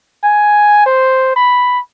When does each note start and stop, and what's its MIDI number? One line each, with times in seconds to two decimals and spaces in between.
0.24 0.85 80
0.86 1.33 72
1.36 1.79 83